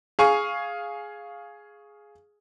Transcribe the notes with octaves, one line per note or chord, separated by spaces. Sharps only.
G#4 F5 G#5 C#6